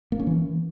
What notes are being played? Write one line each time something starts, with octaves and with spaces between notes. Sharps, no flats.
A#3
C#4
E3